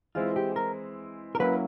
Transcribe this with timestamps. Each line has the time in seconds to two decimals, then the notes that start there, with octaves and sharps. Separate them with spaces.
0.15 E3 G#3 C4 E4 F4
0.36 G4
0.56 A#4
1.35 A#4
1.39 F#3 A#3 C#4 E4 B4